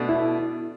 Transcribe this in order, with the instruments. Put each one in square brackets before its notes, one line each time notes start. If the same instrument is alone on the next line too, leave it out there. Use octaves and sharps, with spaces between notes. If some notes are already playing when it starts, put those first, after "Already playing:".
Already playing: [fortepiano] B2 A3 D4
[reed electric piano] E4